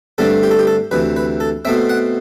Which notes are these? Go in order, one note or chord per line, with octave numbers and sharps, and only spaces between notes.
G2 D3 A3 C4 A4
G4
A4
G4
A4
D2 C3 E3 B4
B4
A4
B2 A3 C4 E5
F#5